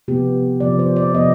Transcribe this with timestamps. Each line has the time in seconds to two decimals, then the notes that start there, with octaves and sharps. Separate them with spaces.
0.08 C3 F3 B3 G4
0.60 C3 F3 B3 D5
0.79 C5
0.96 D5
1.14 C3 F3 B3 D#5